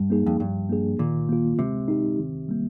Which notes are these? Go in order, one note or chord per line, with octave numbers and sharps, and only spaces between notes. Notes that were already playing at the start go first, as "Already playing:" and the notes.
Already playing: G2 G3
A#3 D#4 G#4
F2
G2 F3
A#3 D4 G#4
A#2 D#3
A#3 F4
C3 G#3
D#4 G4
D#3
G3 A#3